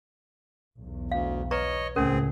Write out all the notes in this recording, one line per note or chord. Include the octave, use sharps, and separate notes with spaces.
B1 E2
D2 F5
B4 C#5 D#5 A#5 C#6
C#2 A2 A3 C4 C#4 G#4 A#4